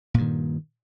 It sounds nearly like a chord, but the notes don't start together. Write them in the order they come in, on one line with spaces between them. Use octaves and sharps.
A#2 G2 D#3